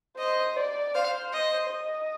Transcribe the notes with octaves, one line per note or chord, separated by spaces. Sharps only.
C5 D#5
D5
C5 F5
D#5
D#5